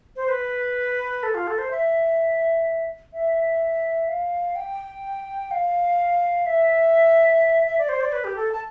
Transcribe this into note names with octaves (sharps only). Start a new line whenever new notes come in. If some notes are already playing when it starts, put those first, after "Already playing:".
C5
B4
A4
F4
A4
C5
E5
E5
F5
G5
F5
E5
E5
D5
C5
D5
B4
G4
A4
A5